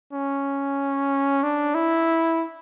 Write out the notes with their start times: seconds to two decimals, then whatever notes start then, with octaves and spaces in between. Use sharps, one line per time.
0.13 C#4
1.43 D4
1.75 E4